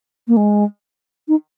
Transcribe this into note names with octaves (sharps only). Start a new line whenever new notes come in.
A#3
G#3
D#4